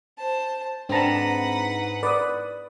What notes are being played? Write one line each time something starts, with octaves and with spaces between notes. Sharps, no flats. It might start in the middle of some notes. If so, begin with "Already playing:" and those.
C5 A5
G#2 C4 D4 B4 F#5 A5 A#5
B4 D5 D6 D#6